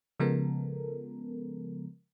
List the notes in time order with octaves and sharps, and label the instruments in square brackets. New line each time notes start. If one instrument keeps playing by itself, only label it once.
[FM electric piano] C#3 F3 G#3 B3 A4 A#4